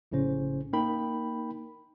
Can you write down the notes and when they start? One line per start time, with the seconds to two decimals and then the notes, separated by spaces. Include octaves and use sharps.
0.12 A#1 A2 C#3 C#4 C5
0.73 A#3 D#4 A#4 G5 B5